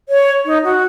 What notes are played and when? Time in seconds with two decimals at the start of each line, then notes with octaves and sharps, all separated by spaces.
0.07 C#5
0.44 D#4
0.62 F#4